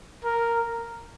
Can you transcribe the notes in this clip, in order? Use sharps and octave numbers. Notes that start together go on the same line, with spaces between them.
A#4